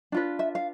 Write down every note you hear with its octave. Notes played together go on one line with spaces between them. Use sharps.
D4 F4 B4
E5
F5